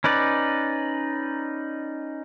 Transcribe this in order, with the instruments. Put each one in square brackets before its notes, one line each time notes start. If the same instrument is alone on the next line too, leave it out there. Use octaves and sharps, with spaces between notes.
[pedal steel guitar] C#4 D#4 B4 D5